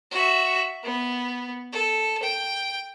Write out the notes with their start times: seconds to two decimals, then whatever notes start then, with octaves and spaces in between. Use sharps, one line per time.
0.11 F#4 E5
0.83 B3
1.72 A4
2.23 G5